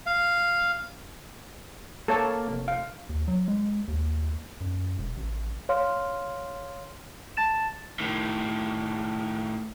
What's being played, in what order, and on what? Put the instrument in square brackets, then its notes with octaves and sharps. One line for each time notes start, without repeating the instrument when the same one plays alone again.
[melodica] F5
[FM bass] A#3 [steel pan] A4 C#5 A5
[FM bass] F1
[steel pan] F5
[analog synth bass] D#2
F#3
G#3
D#2
F#2
E1
A1
[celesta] C#5 F5 C6 F6
A5 A6 E7
[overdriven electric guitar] A2 D#3